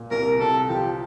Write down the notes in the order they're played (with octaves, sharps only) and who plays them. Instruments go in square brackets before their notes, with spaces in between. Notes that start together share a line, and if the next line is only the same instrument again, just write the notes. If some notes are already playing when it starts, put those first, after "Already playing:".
Already playing: [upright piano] A#2
[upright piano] C2 [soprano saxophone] A#4
[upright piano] C2 [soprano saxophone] A4
[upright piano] F3 [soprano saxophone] G4